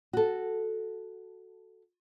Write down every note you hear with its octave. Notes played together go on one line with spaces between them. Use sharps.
F#4 A4